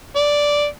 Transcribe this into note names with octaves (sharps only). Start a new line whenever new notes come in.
D5